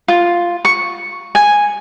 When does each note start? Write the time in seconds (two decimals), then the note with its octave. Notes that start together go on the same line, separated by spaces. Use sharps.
0.08 F4
0.65 C#6
1.35 G#5